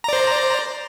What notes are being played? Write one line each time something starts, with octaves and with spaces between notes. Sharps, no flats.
C5 D5 A#5